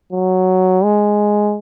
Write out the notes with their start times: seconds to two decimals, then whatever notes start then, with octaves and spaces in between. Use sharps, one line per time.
0.12 F#3
0.84 G#3